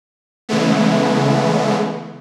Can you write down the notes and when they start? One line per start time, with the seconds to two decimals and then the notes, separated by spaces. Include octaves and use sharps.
0.49 C#3 E3 G#3 A3 B3